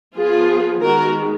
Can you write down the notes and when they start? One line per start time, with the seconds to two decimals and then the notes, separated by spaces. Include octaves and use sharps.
0.16 F3 B3 F4 G#4
0.82 D#3 G#3 B3 F#4 A#4